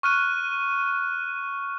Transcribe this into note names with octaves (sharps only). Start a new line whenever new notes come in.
C#6 F6 F#6 D#7